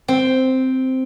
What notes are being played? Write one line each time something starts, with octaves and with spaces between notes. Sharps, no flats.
C4